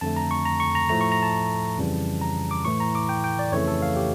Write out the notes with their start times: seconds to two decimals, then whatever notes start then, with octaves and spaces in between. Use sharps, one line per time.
0.01 F2 D3 A3 A5
0.17 A#5
0.31 C#6
0.45 A#5
0.60 C#6
0.75 A#5
0.89 A2 F3 A3 A#5
1.01 C#6
1.12 A#5
1.23 A5
1.78 F2 C#3 E3 G3
2.21 A#5
2.51 D6
2.65 A2 E3 A3 C#6
2.80 A#5
2.95 D6
3.09 G5
3.24 G5
3.39 D5
3.52 F2 C#3 E3 A3 C#5
3.68 A4
3.82 F5
3.96 G4